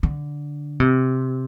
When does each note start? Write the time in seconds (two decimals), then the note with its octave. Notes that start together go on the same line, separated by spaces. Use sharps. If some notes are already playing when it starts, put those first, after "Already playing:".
0.03 D3
0.80 C3